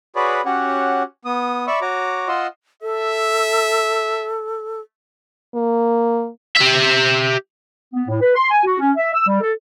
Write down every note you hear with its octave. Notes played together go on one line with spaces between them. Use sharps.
F#4 G#4 B4 C#5 D5 B5
C#4 F#4 G4 C#5 F#5
B3 D#6
D5 E5 B5 C#6 E6
F#4 C#5 A#5 D6
F4 D#5 F#5 C6 E6
A4 E5
A#3
G4 E5
B3
A2
B4
C6
G#5
F#4
C#4
E5
E6
G3
A4